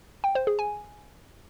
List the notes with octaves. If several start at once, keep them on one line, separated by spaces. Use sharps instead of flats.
G5
C5
G#4
G#5